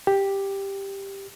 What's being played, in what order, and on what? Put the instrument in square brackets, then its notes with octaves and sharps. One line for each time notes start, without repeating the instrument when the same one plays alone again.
[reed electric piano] G4